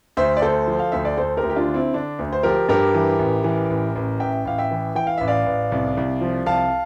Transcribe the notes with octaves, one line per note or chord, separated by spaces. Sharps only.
D2 C5 E5
D5
D2 A4 C5
F3
F5
D2 E5
D5
D2 A4 C5
G4 A#4
D2
G4
D4 F4
D3
C4 E4
D3 D4
D2
C5
F3 G4 A#4
G2 G4 A#4
E3
A1
E3
A1
A1
A1 E5 G5
A1 F5
E5 G5
E3
E3 G5
F5
A1 E5
D5 F5
A1
C2
C2
F3
C2 F5 A5